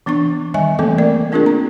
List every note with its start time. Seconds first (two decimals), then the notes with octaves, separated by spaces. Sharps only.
0.06 E3 B3 D4 C#6
0.54 D#3 G3 D#5 E5 G#5
0.79 E3 A3 A#3 C4 A4
0.98 A#3 A#4 D5
1.32 A#3 C4 D4 F4 G#4 A#4
1.46 A#5